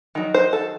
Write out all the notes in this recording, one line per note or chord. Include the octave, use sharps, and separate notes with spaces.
D#3 F#3
C5
A4